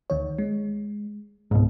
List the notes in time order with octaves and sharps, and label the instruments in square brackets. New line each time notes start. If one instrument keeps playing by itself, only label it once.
[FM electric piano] D2 D#3 C#5
G#3
[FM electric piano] C#2 [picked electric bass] G#2 B2